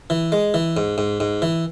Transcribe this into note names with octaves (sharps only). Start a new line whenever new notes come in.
E3
G#3
E3
G#2
G#2
G#2
E3